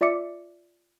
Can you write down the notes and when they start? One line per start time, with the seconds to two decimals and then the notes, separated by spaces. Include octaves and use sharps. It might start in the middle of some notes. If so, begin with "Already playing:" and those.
0.01 F4 D5 E5 D6 C#7